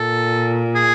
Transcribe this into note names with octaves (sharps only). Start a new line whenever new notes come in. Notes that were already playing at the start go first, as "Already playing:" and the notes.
Already playing: A#2 A4
G#4